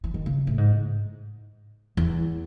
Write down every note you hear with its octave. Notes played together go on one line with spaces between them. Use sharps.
E3
D#3
C#3
A2
G#2
E2